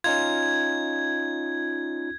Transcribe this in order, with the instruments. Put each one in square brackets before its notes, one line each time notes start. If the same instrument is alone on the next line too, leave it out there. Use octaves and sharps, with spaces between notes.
[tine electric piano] C#4 D#4 F4 [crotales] G#6